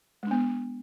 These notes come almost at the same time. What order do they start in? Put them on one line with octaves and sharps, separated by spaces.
G#3 D4 B3